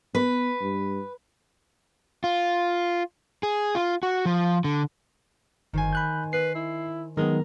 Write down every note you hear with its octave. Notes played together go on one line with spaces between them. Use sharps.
B3 B4
G2
F4
G#4
F4
F#4
F3
D3
G1 D#3 C5 G#5
B5 F#6 G6
B4 C7
E4
D#3 F#3 G#3 B3 A#4